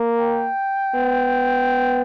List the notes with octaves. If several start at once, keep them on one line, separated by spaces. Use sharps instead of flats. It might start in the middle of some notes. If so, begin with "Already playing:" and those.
Already playing: A#3
G5
B3